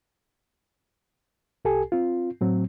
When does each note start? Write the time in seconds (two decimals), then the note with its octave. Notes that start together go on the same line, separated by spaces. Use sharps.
1.65 C2 G4 A4 G#5
1.92 C4 F4
2.41 A2 F#3 C4